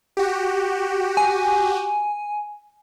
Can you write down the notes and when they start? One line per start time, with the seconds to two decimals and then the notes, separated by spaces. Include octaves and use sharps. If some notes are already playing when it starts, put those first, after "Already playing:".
0.17 F#4 G4
1.17 G#5